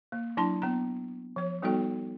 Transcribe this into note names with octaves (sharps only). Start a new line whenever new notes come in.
A#3
F#3 D4 E4 A5 C6
B3 A#5
F3 C#5
G3 B3 D#4 F#4 A4 G5